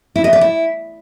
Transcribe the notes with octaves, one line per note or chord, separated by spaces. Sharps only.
E4
D#5
D5
E4